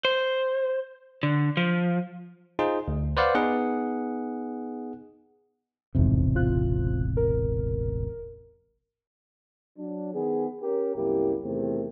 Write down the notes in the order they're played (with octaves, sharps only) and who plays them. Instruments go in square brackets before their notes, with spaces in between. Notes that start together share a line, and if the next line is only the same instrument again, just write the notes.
[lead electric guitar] C5
D3
F3
[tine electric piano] D#4 F4 G#4 C5
D2
B4 C5 D5 F5 F#5
B3 D#4 G#4 F#5
[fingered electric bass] E1 A1 C3 [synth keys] F2 G#2
[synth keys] C4 F4 F#6
A#4
[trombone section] F#3 D4
D#3 B3 G#4
C#4 G4 A#4
C2 F#2 A#3 E4 G4
E2 C3 D#3 A3